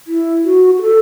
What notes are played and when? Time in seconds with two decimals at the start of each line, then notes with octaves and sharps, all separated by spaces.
0.07 E4
0.44 F#4
0.77 F#4
0.81 A4